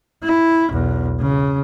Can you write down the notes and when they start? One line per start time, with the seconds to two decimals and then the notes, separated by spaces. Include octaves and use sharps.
0.24 E4
0.70 B1 E2
1.21 C#3